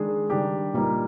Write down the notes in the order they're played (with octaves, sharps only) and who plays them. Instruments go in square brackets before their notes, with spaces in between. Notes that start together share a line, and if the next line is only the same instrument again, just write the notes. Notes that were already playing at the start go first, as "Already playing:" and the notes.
Already playing: [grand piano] D#3 G#3 D4 G#4
D#3 G3 D4 G4
A#2 G3 A#3 D#4